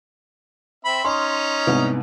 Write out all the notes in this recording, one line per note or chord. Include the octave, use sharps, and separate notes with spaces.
C4 E5 B5
C#4 D#4 C6
C2 G#2 B3